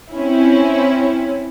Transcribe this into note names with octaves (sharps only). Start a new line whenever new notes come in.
C4 C#4 E4